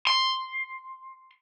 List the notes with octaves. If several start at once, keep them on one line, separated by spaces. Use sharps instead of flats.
C6